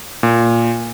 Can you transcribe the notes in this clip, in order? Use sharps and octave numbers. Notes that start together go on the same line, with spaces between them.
A#2